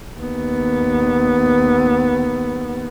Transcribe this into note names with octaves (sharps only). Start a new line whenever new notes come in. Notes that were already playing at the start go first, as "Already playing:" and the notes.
D#2 B3